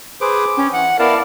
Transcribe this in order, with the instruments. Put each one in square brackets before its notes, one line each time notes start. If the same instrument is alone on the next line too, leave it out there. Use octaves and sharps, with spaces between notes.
[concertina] G#4 B4 C5 [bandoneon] D6
[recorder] C#4 [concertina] G5
[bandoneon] E3 [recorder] F#5
[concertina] B3 E4 [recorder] A#4 [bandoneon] D5 F5 A5